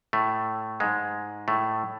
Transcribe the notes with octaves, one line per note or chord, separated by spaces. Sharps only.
A2 A3
G#2 G#3
A2 A3